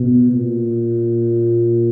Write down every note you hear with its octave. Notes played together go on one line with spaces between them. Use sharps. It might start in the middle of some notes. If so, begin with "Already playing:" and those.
Already playing: B2
A#2